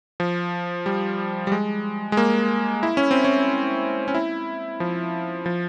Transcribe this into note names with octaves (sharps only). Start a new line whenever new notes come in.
F3
G3
G3
G#3
G#3
A#3
E4
C#4
C4
C#4
C#4
E4
F3
F3